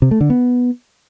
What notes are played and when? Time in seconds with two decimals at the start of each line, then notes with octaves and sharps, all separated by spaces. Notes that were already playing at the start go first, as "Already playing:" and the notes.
0.02 C3
0.11 A3
0.21 D3
0.30 B3